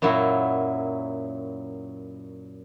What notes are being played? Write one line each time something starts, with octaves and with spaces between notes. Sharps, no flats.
F#2 A#2 F#3 E4